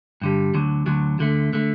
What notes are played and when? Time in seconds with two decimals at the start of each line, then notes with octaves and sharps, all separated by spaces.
0.22 G2 D3 G3
0.54 D2 D3 F#3
0.86 D2 D3 F#3
1.19 D2 D3 A3
1.53 D3 A3